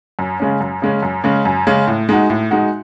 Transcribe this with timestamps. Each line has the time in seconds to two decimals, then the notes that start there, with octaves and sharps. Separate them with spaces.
0.19 F#2
0.40 C#3 G#3 C#4
0.60 F#2
0.82 C#3 G#3 C#4
1.02 F#2
1.24 C#3 G#3 C#4
1.45 F#2
1.67 C#3 G#3 C#4
1.87 A2
2.09 G#3 D#4 F#4
2.30 A2
2.51 G#3 D#4 F#4